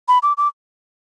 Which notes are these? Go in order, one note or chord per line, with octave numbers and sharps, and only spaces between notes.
B5
D6
D6